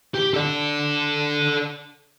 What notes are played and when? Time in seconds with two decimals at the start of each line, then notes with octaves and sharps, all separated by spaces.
0.15 G4
0.34 A4 D5